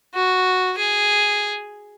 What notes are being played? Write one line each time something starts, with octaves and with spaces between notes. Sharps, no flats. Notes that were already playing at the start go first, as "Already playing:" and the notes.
F#4
G#4